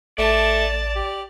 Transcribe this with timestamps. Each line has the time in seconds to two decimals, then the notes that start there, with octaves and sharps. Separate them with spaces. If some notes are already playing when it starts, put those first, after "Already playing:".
0.18 A1 A3 D5 A5
0.96 G4